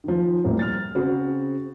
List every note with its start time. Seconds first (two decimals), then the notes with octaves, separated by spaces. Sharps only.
0.04 D#3 F3
0.44 A2 G3 A#3 C4
0.59 F6 A6
0.95 C#3 C4 F#4 G#4 C5